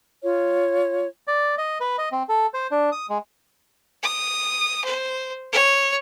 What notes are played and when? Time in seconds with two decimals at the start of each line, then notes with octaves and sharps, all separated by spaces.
0.23 F4 C#5
1.27 D5
1.58 D#5
1.80 B4
1.98 D#5
2.12 C4
2.29 A4
2.54 C5
2.71 D4
2.92 D#6
3.10 G#3
4.03 D#6
4.84 C5
5.53 C#5